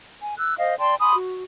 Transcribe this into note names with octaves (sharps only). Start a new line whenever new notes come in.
G#5
E6 F#6
C5 D#5 F5
D5 G5 A5 C6
G#5 B5 C6 D#6
F#4